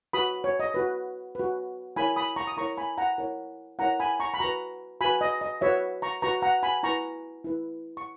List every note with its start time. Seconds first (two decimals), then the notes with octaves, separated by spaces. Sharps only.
0.13 F#4 B4 B5 D#6
0.44 C#5
0.60 D#5
0.74 F#4 B4
1.35 F#4 B4
1.96 E4 A#4 C#5 G#5 B5
2.16 B5 D#6
2.36 A#5 C#6
2.47 D#6
2.57 E4 A#4 C#5 A#5 C#6
2.77 G#5 B5
2.98 F#5 A#5
3.18 E4 A#4 C#5
3.79 E4 A#4 C#5 F#5 A#5
4.00 G#5 B5
4.20 A#5 C#6
4.34 B5
4.40 F#4 B4 A#5 C#6
5.01 F#4 G#5 B5
5.04 B4
5.21 D#5
5.41 D#5
5.61 F#4 B4 C#5 E5
6.02 A#5 C#6
6.22 F#4 B4 A#5 C#6
6.42 F#5 A#5
6.63 G#5 B5
6.83 E4 B4 A#5 C#6
7.44 E4 B4
7.97 C#6